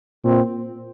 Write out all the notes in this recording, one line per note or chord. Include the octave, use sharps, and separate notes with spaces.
A#2 C4